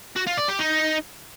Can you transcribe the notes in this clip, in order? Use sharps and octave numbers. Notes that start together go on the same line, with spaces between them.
F#4
F4
D5
G4
D#4